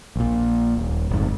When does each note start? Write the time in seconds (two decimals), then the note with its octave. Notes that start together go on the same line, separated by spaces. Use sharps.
0.16 A#1 A#2
0.77 D#1
1.11 G1 F2 G#2